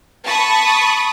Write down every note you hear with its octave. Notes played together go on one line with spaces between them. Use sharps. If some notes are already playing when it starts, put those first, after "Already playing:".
A5 B5 C#6 D#6